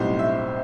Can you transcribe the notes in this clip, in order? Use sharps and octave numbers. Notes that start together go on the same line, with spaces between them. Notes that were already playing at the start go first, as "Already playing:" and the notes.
Already playing: B1 A2 G3 C4 C5
E5